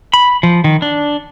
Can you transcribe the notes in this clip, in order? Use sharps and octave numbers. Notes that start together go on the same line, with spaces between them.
B5
F3
D#3
D4